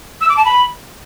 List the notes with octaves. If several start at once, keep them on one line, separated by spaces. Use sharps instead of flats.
E6
D6
A5
B5